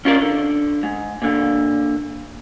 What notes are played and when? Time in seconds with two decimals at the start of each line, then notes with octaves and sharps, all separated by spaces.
0.05 C#4 F4 A#4 C#5 D5
0.21 D3
0.83 G#2
1.22 A#2 D3